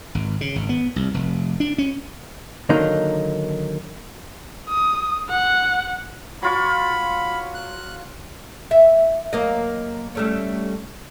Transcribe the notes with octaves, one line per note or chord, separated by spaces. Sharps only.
G#1
C#3
G#1
B3
C2
F1
D4
C#4
D3 D#3 F#3 A#3 D#4
D#6
F#5
F#3 F4 B5 C#6
F#6
E5
F#2 A#3 D#5
G3 A3 C#4